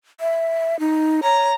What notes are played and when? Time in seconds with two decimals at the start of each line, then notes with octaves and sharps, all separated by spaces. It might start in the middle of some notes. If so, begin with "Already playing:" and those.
0.20 E5
0.79 D#4
1.23 C#5 A#5